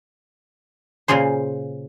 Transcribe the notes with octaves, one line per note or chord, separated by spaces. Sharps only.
A#2 C#3 F4 G#4 C5